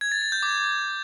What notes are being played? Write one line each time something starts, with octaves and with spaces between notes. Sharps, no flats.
G#6
A6
A6
G6
D6